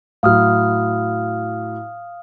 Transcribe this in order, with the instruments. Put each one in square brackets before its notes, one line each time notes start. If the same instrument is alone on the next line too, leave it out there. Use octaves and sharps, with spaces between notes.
[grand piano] A2 F#3 [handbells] F5 D#6 F6